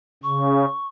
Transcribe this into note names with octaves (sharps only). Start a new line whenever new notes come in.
C#3 C#6